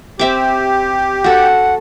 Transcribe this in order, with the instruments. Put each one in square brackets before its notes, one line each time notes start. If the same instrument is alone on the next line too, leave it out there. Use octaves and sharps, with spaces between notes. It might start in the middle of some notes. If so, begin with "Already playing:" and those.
[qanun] C4 E5 D6 [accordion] G4
[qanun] F#4 A4 [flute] F#5